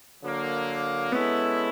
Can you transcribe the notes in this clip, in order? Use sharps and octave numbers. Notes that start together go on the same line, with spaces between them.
D3 F#3 A#3
G#3 B3 C#4 E4 A4